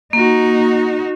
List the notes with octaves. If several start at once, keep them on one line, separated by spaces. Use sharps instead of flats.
A#3 D#4 F#4